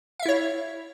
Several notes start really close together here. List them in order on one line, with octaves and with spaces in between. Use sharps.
F5 E5 E4 C#5